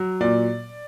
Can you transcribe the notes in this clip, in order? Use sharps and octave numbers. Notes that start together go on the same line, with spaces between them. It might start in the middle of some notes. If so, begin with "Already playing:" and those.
Already playing: F#3
A#2 D5